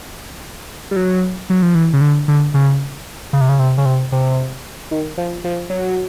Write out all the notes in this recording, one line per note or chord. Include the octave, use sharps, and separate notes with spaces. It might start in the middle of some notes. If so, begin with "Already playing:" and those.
G3
F#3
F#3
F3
E3
C#3
D3
D3
C#3
C#3
C3
C#3
C3
C#3
C3
C3
D#3
F3
F3
F#3